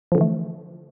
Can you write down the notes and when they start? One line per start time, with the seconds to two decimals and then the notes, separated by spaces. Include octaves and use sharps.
0.12 F3
0.15 D3
0.18 E3
0.21 A3